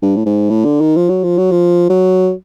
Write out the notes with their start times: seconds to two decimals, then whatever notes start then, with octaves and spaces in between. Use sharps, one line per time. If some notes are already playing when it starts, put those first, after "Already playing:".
0.02 G2
0.17 A2
0.26 G#2
0.50 A2
0.65 D3
0.81 D#3
0.96 F3
1.09 F#3
1.24 F3
1.38 F#3
1.51 F3
1.90 F#3